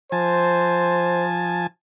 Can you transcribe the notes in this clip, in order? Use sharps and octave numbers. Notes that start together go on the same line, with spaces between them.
F3 C5 G#5 A5